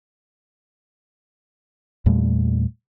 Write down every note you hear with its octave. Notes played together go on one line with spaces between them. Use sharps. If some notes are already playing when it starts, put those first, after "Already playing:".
E2 A#2 G3 A3